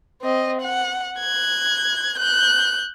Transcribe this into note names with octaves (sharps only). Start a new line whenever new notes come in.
C4 D#5
F#5
F#6 G#6
F#6 G6